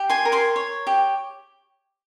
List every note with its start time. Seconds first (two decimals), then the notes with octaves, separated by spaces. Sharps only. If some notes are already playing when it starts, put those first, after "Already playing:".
Already playing: G4
0.10 G#5 C6
0.25 A#4
0.32 G#5 C6
0.56 C#5
0.87 G4